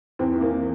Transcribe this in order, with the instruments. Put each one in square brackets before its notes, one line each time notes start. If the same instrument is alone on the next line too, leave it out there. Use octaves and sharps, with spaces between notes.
[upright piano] E2 C4
E3
A#3
E3